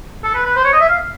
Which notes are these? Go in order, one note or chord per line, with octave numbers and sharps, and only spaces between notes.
A4
B4
B4
C5
C#5
D#5
E5
F5